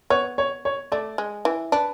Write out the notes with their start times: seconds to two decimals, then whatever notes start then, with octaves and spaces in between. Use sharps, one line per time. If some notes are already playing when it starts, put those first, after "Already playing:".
0.10 B3 C#5
0.38 C#5
0.65 C#5
0.92 A3 D5
1.18 G#3
1.45 E3
1.72 D4 B4